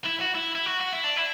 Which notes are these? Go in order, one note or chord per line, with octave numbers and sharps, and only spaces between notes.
E4
F#4
E4
E4
F#4
F#4
E4
D4
E4